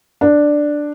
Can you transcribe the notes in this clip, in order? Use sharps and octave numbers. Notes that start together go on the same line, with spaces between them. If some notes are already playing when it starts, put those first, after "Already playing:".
D4